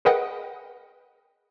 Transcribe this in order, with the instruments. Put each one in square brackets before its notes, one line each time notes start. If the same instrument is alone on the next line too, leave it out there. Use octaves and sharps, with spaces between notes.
[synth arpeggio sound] G#4 A#4 B4 D#5 F#5 G5